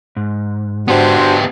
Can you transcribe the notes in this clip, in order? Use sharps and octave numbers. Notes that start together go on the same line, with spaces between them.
G#2
B3 D4 F#4 G4 C5